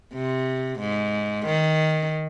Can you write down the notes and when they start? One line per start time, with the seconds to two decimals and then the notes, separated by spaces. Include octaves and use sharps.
0.13 C3
0.79 G#2
1.46 D#3